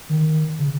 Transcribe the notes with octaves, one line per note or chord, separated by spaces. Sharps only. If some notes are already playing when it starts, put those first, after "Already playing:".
D#3
C#3